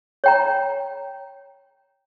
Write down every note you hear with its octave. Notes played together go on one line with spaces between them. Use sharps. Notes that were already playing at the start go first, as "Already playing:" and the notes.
C#5 G5 A#5